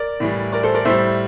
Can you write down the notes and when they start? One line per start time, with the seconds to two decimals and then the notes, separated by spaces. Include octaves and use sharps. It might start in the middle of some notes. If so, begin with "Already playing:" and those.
Already playing: A#4 D5
0.20 A2 E3 G3
0.52 A#4 D5
0.63 A4 C5
0.74 A#4 D5
0.85 A2 G3 C5 E5